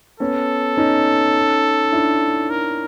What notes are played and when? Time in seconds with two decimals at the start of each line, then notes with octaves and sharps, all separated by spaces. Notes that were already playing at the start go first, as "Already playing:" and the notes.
0.20 B3 C#4 A4
0.77 C#4 D#4
1.92 D4 E4
2.50 A#4